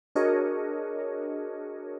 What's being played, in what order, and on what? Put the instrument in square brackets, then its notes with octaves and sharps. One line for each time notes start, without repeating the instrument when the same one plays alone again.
[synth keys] D4 F#4 G#4 A#4 C#5 D#5